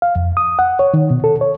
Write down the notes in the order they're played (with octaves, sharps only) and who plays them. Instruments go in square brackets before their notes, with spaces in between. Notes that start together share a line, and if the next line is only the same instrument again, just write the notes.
[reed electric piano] F5
F2
D#6
F#5
C#5
D#3
B2
A4
C#5